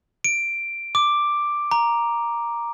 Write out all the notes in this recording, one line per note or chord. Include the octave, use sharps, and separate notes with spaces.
D7
D6
A#5